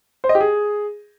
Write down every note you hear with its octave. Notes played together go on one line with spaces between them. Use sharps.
C5
D#5
G4
G#4